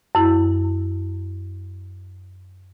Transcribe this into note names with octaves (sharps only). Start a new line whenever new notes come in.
F#2 E4